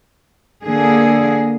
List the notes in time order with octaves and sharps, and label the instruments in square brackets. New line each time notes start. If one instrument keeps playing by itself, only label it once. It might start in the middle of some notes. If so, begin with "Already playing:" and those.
[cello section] D3 A#3 G#4